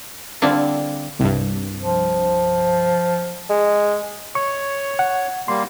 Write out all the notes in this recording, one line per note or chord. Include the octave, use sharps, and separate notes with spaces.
D3 G3 C4 D4 E4 F4
C2 G2
F3
G#3
C#5 C#6
F#5
G3 A#3 C6